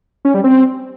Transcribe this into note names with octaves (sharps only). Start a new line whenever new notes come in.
C#4
G3
C4